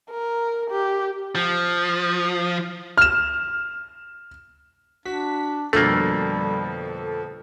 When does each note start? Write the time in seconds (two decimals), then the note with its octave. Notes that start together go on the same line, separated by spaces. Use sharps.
0.10 A#4
0.70 G4
1.35 F3
2.97 F6 E7
5.05 D4 F#4 B6
5.73 F2 B2 D3 G3 A3 A#3 A4